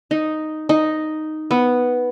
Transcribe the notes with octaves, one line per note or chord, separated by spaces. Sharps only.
D#4
D#4
B3